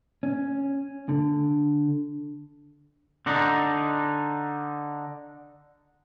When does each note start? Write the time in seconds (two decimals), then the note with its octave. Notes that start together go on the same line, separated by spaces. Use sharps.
0.23 C#4
1.09 D3
3.26 D3 D4 D#4